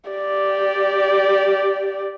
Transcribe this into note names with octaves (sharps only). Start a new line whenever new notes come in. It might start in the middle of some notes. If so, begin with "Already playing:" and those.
G4 D5